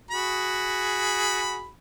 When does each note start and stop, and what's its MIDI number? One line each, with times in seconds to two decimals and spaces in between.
0.11 1.68 66
0.11 1.68 68
0.11 1.68 83